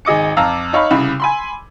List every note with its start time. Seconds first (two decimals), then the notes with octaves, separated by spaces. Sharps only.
0.05 G#1 G#4 D#5 D6 C#7
0.37 F2 F5 A#5 E6
0.73 D#4 C#5 F5 B5
0.91 C2 C#3 B5
1.20 G#5 B5 C6